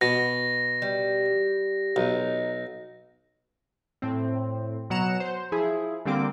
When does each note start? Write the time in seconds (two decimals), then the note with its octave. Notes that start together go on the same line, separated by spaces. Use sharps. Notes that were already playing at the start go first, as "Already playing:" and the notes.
0.01 B2 A#6
0.82 G3
1.96 B1 D#4
4.02 A2 C4
4.90 B2 F#3 F#5 A#5 C#7 E7
5.20 C5
5.52 F3 E4 G#4
6.05 D3 G3 A#3 C4 D6